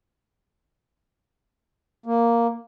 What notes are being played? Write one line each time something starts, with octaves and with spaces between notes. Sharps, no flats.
A#3